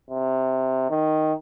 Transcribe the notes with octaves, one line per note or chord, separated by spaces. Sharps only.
C3
D#3